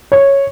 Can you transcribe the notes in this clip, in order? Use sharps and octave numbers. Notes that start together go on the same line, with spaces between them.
C#5